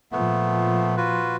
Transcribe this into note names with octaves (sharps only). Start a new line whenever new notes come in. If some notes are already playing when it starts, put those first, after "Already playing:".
A#2 F3 A3 B3
F4 F#4 B4